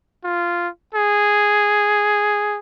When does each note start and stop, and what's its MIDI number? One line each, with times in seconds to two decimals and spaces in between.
0.24 0.68 65
0.95 2.59 68